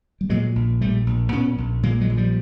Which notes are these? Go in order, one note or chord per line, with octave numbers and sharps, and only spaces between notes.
G3
A#2 F#3 G#3
A#1
A#2 G3 A3
A#1
A#2 B3 C#4
A#1
A#2 G#3 A#3
F#3 G#3
A#1
F3 G3